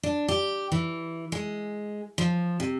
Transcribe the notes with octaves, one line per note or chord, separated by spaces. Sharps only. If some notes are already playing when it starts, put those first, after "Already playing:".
D4
G4
E3
G#3
F3
C3